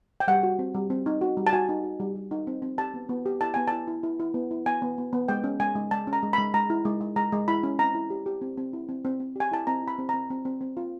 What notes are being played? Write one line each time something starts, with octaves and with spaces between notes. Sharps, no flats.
G5
G3 F#5
F#4
C4
G3
C4
D#4
F#4
G3
A5
F#4 G#5
D#4
F#4
G3
G3
D#4
C4
C4
G4 A5
B3
B3
G4
E4 A5
B3 G#5
E4 A5
E4
E4
E4
B3
E4
B3 G#5
B3
B3
B3
G#3 G5
C#4
G#3 G#5
G#3
G#3 A5
C#4
A#5
G#3
B5
G#3
G#3 A#5
E4
G#3
G#3
G#3 A#5
G#3
E4 B5
C#4
C4 A#5
E4
G4
G4
C4
C4
E4
C4
C4
C4
G4 G#5
E4 A5
C4 A#5
E4 B5
C4
C4 A#5
C4
C4
C4
F4